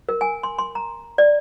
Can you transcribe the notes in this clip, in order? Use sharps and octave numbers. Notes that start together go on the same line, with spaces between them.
A#4
G#5
C6
C6
A#5
D5